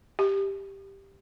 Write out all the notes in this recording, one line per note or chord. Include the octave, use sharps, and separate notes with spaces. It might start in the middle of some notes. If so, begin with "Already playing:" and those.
G4